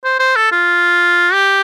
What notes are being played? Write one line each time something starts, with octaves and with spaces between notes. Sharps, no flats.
C5
C5
A4
F4
G4